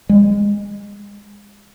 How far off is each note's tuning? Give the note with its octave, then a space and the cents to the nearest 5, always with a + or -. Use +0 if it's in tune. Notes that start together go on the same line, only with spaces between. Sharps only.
G#3 -25